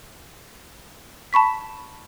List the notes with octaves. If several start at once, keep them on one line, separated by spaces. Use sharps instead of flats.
A5 B5 C#6 B6